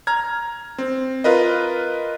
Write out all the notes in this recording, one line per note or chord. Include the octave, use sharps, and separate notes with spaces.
A#5 F6 G#6
C4
F4 A#4 B4 D#5